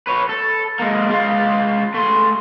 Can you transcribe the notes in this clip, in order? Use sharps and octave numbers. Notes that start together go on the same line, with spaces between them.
B4 C#5
A4
G#3 A#3
G#3 F4
A3 C6